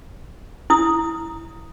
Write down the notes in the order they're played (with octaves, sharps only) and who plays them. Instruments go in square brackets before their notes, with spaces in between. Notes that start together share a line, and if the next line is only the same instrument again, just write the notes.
[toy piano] E4 D#6